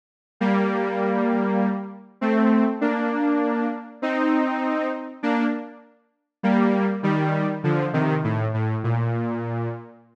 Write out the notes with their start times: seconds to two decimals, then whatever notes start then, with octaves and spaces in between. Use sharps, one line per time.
0.40 G3 A#3
2.21 A3 C4
2.81 A#3 D4
4.02 C4 D#4
5.23 A#3 D4
6.43 G3 A#3
7.03 D#3 G3
7.64 D3 F3
7.93 C3 D#3
8.24 A2
8.54 A2
8.84 A#2